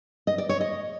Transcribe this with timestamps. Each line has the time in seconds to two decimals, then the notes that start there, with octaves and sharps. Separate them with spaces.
0.27 D#5
0.38 D5
0.49 C#5
0.60 D#5